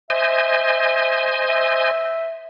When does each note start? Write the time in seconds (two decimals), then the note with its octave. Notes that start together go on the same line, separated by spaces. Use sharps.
0.10 C5 D#5 E5 G#5
1.48 E5